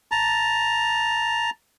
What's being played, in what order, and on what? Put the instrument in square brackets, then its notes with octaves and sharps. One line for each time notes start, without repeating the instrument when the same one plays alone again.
[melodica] A5 A#5